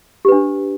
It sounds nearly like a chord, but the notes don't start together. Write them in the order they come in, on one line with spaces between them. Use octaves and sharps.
G4 B4 D4